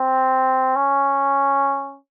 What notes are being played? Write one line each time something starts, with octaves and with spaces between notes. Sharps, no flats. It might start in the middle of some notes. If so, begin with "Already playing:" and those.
Already playing: C4
C#4